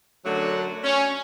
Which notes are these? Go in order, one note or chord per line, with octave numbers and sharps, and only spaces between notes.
F#2 D3 F#3 A3 D4 F#4
C#4